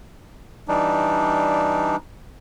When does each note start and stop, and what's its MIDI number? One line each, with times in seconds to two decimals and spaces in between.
0.68 1.96 52
0.68 1.96 55
0.68 1.96 62
0.68 1.96 63